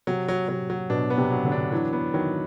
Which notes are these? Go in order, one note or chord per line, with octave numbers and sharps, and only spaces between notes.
C3 F#3
F#3
C3 F#3
F#3
B2 D4
B3
C3
F#3
D3
D4
E3 F#3
B3
D#3 F#3